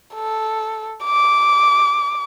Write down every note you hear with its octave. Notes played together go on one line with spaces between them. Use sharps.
A4
D6